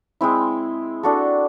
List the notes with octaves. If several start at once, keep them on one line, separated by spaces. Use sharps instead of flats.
G#3 C4 E4
D4 F#4 A4